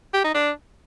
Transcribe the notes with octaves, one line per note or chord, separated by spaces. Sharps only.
G4
D#4
D4